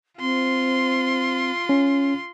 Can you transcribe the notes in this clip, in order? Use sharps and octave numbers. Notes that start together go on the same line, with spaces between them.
C4 F4 C6
C#4